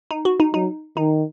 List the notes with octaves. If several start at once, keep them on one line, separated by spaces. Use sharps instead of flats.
D#4
F#4
D#4
F#3 D#4
D#3 D#4